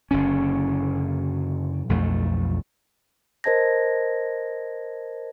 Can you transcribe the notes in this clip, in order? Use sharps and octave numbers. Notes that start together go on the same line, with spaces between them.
F#1 D3 C#4
B1 F2 A3
A#4 C5 D#5 A5 G#6 A#6